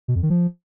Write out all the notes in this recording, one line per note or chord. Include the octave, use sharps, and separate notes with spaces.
B2
F2
D#3
F3